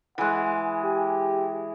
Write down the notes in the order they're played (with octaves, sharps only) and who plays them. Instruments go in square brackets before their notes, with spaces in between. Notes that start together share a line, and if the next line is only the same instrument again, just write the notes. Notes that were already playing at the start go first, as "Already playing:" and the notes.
[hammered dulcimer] E3 G#3 [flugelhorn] F#5
[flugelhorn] G4